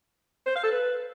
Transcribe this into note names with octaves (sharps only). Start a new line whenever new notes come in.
C5
F5
A4
B4